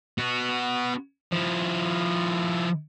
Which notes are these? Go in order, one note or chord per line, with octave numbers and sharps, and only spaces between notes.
B3 F#4
F3 E4